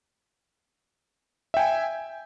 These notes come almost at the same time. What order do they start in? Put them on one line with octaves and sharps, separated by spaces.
E5 G5 G#5